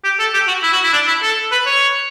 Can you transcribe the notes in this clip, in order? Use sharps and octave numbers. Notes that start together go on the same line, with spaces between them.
G4
A4
G4
F#4
E4
F#4
E4
D4
E4
A4
B4
C#5